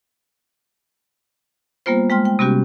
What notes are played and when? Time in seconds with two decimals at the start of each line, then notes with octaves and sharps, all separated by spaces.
1.86 G3 A#3 B3 F4 C5
2.10 G#3 G5 C6 F6
2.25 G5
2.39 C3 G3 B3 C#4 F#4 G4